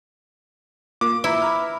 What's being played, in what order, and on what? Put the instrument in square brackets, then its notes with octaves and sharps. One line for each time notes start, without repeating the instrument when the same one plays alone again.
[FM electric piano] A#3 F4 [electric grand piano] D6
[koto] E4 [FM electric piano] B4 A#5 E6
[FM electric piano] A#5 B5 F6